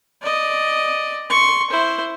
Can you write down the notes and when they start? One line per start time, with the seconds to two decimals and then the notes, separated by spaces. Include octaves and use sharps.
0.22 D5 D#5
1.30 C6 C#6
1.71 E4 C5